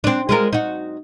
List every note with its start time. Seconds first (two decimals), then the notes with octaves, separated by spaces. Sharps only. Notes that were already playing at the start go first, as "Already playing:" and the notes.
0.04 C4 D4
0.29 G#3 F4 A#4
0.53 D#4 F#4